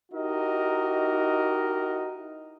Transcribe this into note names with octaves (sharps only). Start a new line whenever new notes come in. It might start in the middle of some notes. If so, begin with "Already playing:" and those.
D#4 E4 F#4 G4 A#4 D#5